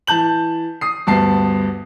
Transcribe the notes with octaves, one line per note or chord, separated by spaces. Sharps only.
E3 A5 G6 F#7
D#6 C7
D2 G2 B3 A5 C7